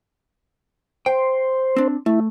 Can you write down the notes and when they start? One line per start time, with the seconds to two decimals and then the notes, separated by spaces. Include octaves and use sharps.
1.06 C5 G5
1.76 C4 D4
2.06 A3 E4